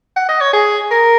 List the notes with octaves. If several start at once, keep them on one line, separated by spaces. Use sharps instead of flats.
F#5
D#5
C#5
G#4
A#4